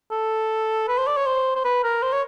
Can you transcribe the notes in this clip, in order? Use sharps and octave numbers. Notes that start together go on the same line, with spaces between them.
A4
B4
C5
D5
C#5
C5
C5
B4
A#4
C5
C#5